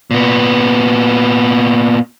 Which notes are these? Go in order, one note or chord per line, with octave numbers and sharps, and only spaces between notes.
A#2 B3